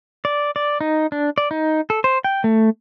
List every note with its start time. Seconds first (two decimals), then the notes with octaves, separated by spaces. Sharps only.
0.25 D5
0.56 D5
0.81 D#4
1.12 D4
1.38 D5
1.51 D#4
1.90 A4
2.04 C5
2.24 G5
2.44 A3